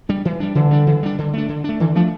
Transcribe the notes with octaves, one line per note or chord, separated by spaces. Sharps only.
G3 D4
E3
G3 D4
D3 E3
G3 D4
E3
G3 D4
D3
A3 D4
D3
A3 D4
D3 E3
F3 A3 D4